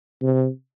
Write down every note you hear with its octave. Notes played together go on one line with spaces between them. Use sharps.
C3